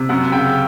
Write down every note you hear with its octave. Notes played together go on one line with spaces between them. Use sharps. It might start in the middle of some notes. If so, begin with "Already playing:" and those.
Already playing: C3
F#2 F#5
C#3 G5